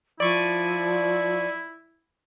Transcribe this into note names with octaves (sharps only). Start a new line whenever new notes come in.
F3 E4 D5 C#6 D#7